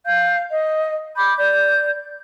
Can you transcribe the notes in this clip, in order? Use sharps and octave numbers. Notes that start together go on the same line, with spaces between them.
F5 G6
D#5
B5 D6 G6
D5 G6